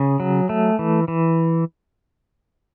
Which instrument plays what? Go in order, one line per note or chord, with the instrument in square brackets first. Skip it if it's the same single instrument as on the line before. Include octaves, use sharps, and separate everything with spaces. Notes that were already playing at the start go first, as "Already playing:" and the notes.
Already playing: [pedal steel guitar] C#3 G#4
F#3
A3
E3
E3